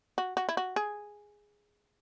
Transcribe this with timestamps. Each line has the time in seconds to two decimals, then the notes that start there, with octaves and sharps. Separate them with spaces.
0.18 F#4
0.37 F#4
0.49 E4
0.57 F#4
0.76 G#4